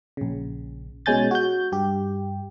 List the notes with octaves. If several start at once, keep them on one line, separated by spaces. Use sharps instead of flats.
A#1 C#3
B2 G#3 C#4 G#5 G6 A6
F#4 G6
G2 G4